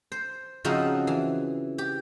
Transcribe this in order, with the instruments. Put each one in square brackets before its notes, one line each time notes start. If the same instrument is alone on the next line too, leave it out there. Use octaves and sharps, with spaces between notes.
[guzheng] C5
C#3 F3 C4 D#4 F4 F#4
E3
G4